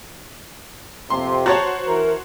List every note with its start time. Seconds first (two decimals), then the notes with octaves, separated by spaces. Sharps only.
1.10 F2 C3 C6
1.46 F#4 C5 C#5 A5 A#5
1.86 E3 A#4